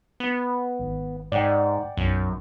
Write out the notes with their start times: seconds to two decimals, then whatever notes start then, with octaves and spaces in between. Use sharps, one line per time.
0.20 B3
0.79 G#1
1.32 G#2 D5 F#5 G5
1.97 B1 F#2